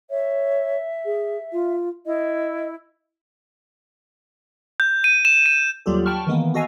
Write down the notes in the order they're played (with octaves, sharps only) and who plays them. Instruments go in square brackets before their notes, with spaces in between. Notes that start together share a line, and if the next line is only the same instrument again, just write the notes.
[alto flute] C#5 [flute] E5
[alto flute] G#4
F4
[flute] E4 [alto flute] D#5
[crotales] G6
D#7
E7
D#7
[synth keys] D#2 F#3 G3 F4 G4 A4
G5 A5 B5 C#6 F6
D#3 E3 G#3 A#3 B3
B3 F#4 A4 D#5 F5 G#5